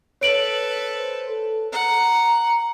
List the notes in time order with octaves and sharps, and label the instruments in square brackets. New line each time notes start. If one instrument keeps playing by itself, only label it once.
[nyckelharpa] A4 B4 [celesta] C#5 D7 F#7
[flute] C5
A4
[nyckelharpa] F#5 [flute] A#5